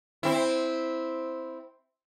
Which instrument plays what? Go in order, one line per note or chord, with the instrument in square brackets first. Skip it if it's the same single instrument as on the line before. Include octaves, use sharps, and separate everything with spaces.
[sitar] C4 E4